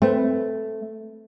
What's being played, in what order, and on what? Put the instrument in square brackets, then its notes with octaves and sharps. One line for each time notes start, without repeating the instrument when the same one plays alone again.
[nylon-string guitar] A3 [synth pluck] C4 B4